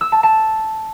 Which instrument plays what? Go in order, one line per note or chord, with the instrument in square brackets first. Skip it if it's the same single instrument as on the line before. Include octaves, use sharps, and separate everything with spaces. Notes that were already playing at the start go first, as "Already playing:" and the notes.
[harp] E6
A5
A5